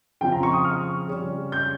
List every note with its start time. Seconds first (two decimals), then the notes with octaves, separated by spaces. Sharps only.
0.21 C#3 F3 C4 F4 G5
0.32 A#5
0.43 C#6
0.53 D#6
0.65 F6
1.08 C#3 G3 C#4
1.52 G6